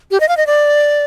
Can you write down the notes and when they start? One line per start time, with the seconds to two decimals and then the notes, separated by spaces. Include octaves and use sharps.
0.11 G4
0.20 D#5
0.29 F5
0.37 D#5
0.47 D5